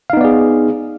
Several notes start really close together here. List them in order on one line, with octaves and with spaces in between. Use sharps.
F5 D#4 B3 D5 G#4